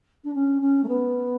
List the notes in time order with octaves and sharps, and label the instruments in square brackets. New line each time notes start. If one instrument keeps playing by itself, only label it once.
[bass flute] D4
C#4
C#4
A3
B3